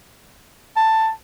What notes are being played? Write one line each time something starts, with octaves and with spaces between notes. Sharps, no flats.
A5